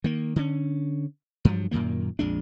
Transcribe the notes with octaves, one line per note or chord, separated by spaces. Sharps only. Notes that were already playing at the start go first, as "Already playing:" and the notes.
D#3 A#3
D3 C#4
G2 F3 F#3
F#2 A#2 D#3 A#3
A#1 F2 G#3 D4